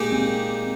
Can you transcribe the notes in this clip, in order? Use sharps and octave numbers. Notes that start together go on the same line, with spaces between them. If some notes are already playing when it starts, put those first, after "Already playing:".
Already playing: A#2 G#3 D#4 G4
C4